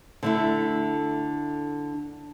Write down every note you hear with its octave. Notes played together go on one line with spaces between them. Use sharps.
D3 A3 E4